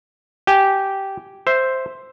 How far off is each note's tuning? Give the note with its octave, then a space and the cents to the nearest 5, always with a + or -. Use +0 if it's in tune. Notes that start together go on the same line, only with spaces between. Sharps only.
G4 -10 G#5 +0
C5 +0 E5 +0